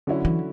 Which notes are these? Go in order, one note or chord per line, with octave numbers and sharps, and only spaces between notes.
D3 F#3 C#4 E4
E3